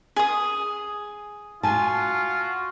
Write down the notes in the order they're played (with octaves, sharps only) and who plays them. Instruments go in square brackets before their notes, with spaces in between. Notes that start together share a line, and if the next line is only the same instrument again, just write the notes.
[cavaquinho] G#4 D#6
[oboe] F4 [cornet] F#4 [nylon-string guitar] G#5 A5